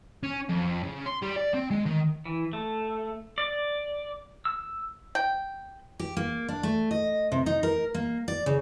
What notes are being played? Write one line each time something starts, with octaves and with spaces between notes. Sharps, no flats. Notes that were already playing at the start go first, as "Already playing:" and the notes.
C#4
F2
C#3
C6
G3
D5
C4
G#3
D#3
E3
A3
D5
E6
G5
G4
A#3
D4
A3
D#5
C3
D#4
A#4
A#3
D5
C#3